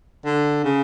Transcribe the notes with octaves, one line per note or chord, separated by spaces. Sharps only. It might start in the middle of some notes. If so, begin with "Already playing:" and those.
D3
C#3